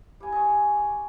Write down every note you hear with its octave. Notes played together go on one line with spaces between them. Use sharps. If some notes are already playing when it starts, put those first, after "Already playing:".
G3 G#5
C#5 D#5
D5